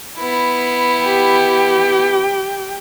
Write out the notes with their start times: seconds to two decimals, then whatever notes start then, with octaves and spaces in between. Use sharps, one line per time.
0.18 B3 E4
1.02 G4 G5